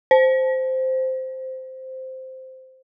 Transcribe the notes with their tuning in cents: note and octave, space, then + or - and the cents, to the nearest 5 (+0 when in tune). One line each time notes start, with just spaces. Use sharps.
C5 -5